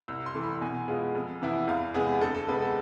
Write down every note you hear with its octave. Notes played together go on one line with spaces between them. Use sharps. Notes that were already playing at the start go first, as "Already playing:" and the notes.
C2 E6
C6
C3 E3 A3
B5
B2 G#5
G#3 B3 F4
F2
C3 E3 B3 E4
E2 F5
C3 G#3 B3 G#4
D2 A4
A4
C3 G#3 B3 B4
A4